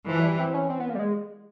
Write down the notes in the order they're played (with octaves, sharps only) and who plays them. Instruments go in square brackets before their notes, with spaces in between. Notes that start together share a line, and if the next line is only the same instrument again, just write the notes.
[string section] E3 [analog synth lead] F3
[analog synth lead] F#3
G3
C4
C#4
C4
B3
A#3
G3
G#3